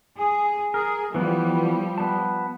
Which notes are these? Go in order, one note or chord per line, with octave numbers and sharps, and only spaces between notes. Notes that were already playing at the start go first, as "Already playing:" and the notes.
G#4
G#4 A#4
E3 F3 G3 B3
B3 A5